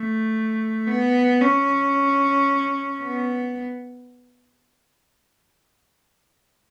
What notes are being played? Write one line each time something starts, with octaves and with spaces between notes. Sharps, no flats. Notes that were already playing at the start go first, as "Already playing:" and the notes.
Already playing: A3
B3
C#4
B3